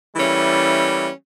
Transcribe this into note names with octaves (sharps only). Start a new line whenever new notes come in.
E3 G3 A3 A#3 C#4